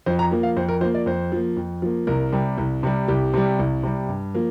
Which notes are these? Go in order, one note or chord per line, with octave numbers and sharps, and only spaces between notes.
F2 C5
A#5
F3 A#3
F5
F2 C5
A#4
F3 A#3 C5
D5
F2 C5
F3 A#3
F2
F3 A#3
C2 A#4
C3 G3
C2
C3 G3
C2 G4
C3 G3
C2
C3 G3
G2
F3 A#3